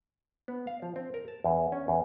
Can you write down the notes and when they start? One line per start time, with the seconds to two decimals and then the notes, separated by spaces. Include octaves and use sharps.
0.48 B3
0.67 F5
0.82 F3
0.96 C4
1.14 A#4
1.28 A5
1.44 E2
1.72 C#4
1.88 E2